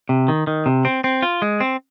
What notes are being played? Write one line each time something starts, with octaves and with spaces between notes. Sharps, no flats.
C3
D#3
D#3
C3
C4
C4
F4
G#3
C4